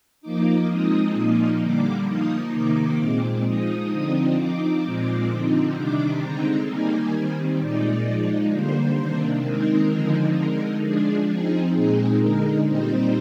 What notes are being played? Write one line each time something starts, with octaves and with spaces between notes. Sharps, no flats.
F3 A#3 D#4 D6
F3 G#3 C4 D#4 D#6
A#2 F3 A#3 D#4
D3 G3 A#3 D6
F3 A#3 D#4 D#6
C3 D#3 A#3 D#4 D6
A#2 G#3 C4
F3 G#3 D#4 D#6
D3 F3 C4 D#4
F3 C4 D#4 D6
A#2 F3 G#3 C4
D3 F3 C4 D#4
C3 D#3 G3 D4 D6
D3 G#3 C4 D#4 A#5
D#3 G3 A#3 D#4 G#5
D#3 G3 C4
A#2 G#3 D#4 D5
F3 G#3 D#4
D3 G3 A#3 C5
C3 D#3 A#3 D4
D#3 G#3 C4 D#4 A#4
D3 F3 G#3 C4 D#4
D3 G#3 D#4 A#4
F3 G#3 D4 G#4
F3 C4 D#4 G#4
A#2 G#3 C4 D#4 G#4
D3 G#3 D#4 A#4
A#2 G3 C4 D#4 C5